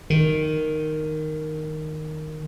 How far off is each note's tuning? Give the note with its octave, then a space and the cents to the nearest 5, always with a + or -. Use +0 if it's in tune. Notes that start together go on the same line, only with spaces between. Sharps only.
D#3 -5